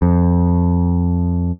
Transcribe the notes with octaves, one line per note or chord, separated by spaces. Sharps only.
F2